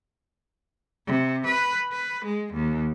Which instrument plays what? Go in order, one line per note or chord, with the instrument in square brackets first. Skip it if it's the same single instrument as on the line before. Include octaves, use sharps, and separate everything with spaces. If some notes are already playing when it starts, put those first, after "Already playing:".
[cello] C3
B4
B4
G#3
D#2